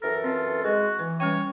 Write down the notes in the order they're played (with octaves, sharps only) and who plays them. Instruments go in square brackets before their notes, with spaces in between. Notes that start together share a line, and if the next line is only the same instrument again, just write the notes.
[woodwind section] F#2 E3 A4 [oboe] A#4
[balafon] C4 [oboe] F4
[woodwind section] G#3 [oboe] F#4 [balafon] B4
[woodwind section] E3 [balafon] B4
[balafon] G3 C#4 G5 [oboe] C#5